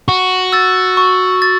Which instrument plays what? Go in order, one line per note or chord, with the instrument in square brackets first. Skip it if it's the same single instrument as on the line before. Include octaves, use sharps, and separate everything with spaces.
[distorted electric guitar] F#4 [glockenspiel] C#6
[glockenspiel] E6 A6
C#6
A6